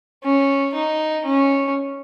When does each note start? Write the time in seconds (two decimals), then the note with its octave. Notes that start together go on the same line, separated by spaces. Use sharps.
0.24 C#4
0.75 D#4
1.25 C#4